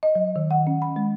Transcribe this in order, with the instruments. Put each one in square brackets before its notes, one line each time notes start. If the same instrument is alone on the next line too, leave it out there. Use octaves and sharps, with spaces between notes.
[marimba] D#5
F#3
D#3
F#5
C#4
B5
G#3